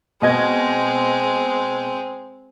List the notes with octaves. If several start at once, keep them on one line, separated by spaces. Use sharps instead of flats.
B2 G#3 C4 D#5 G#6